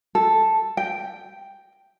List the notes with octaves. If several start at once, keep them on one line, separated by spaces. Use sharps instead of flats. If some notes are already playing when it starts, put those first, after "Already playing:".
A4
G5